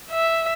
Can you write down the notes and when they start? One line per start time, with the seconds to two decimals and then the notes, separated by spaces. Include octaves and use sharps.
0.11 E5